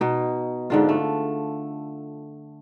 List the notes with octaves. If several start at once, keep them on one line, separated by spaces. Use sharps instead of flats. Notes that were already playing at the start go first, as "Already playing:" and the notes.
B2 D#4
G#2 D3 F4
A3